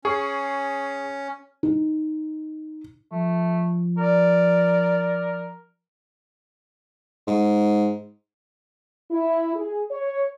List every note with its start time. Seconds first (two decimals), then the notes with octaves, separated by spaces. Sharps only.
0.05 C#4 G#4 C#6
1.63 D#4
3.12 F3 A3
3.98 A#4 D5
7.27 G#2
9.11 E4
9.54 G#4
9.90 C#5